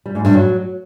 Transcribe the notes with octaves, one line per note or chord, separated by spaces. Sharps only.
G3
G#2
G2
F#3